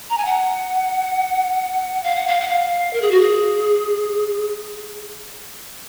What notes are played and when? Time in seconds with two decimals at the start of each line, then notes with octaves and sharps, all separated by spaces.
0.10 A#5
0.18 G#5
0.25 F#5
2.03 F5
2.16 F#5
2.28 F5
2.40 F#5
2.48 F5
2.93 A#4
3.02 G#4
3.11 F#4
3.21 G#4